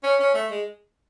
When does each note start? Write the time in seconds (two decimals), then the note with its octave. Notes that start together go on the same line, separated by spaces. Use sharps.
0.04 C#4
0.19 C#4
0.35 A3
0.51 G#3